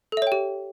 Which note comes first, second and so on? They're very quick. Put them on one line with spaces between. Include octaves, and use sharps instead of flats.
A4 E5 C#5 G5 G4